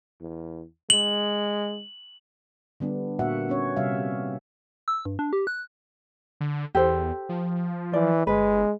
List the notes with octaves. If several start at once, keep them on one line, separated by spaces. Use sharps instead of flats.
E2
G#3 F#7
D3 G3 B3 D4
A#2 A#3 F#4 E5 F#5
B3 C#4 C#5
C3 G3 E5 F5
E6
G2
D4
G4
F#6
D3
E2 G4 A4 C5
F3
E3 D5
G1 G#3 B4